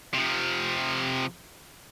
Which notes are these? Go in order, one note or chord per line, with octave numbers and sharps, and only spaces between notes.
C3 F3